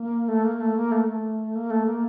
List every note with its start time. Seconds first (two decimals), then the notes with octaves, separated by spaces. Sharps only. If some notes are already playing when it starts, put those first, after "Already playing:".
Already playing: A#3
0.28 A3
0.44 A#3
0.60 A3
0.76 A#3
0.92 A3
1.07 A3
1.55 A#3
1.70 A3
1.86 A#3